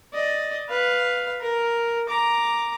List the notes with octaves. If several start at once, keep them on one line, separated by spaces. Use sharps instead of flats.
D5 D#5
B4 F5
A#4
A#5 D6